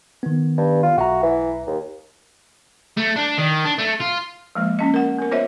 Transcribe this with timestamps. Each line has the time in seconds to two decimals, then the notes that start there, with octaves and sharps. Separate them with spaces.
0.23 D#3 B3
0.57 G2
0.83 F4
0.98 B1 F#4 E5 A#5
1.23 E3
1.67 D#2
2.97 A3
3.16 D4
3.38 D#3
3.65 D4
3.78 A3
4.00 F4
4.55 F3 G#3 A#3
4.79 A#3 C#4 D#5
4.94 A#4 F#5
5.19 B3 A#4
5.31 F4 C5 C#5 D#5 E5